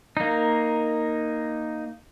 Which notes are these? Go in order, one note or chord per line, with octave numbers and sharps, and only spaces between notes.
A#3 D#4